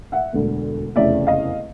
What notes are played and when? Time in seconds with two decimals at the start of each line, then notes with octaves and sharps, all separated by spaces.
0.12 E5 F#5
0.33 E1 D2 D3
0.96 F1 E2 C#3 D5 E5
1.27 D#5 F5